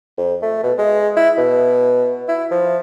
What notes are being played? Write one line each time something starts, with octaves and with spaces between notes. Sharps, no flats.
F2
A3
B2
G#3
E4
B2
E4
F3